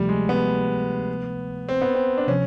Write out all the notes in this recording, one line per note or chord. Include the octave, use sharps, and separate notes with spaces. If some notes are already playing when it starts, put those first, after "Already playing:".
Already playing: D2 C3 F3 G3 A3
G#3
B3
C4
B3
C4
D4
C3 F3 C#4